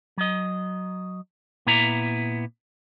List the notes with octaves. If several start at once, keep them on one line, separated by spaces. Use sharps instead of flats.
F#3 D#5
A#2 B3 E4 A#5